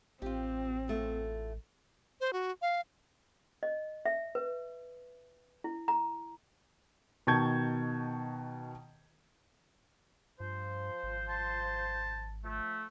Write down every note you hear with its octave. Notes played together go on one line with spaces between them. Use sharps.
A1 C4 F4 G4
E2 A3 F4
C5
F#4
F5
D#5
E5
B4
E4
A#5
B2 D#3 A5 C#6 G6 G#6
G2 F3 C5
G#1
A5
F3 A3